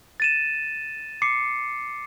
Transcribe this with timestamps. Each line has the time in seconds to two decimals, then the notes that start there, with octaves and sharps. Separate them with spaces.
0.20 A6 D#7 E7
1.22 D6 C7 C#7